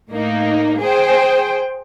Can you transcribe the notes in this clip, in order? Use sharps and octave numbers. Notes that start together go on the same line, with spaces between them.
A2 A#3 D#4
G#4 C5 G5